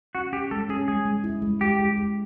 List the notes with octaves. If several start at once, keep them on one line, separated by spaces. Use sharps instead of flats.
C#4 F#4
C#4 G4
G#3 A4
C#4 G#4
G#3 G#4
G#3
E4
G#3
G#3 G4
G#3
G#3